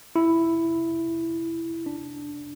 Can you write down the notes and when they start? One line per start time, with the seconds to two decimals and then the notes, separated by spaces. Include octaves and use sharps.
0.16 E4
1.86 D4